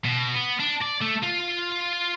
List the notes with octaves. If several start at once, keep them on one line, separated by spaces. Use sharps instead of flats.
B2
B3
D4
D5
A3
F4